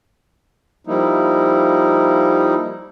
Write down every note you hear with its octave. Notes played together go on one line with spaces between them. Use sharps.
F3 G3 A#3 D#4 E4